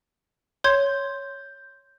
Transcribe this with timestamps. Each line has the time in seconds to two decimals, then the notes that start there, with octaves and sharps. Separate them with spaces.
0.64 C#5 C6 G6 G#6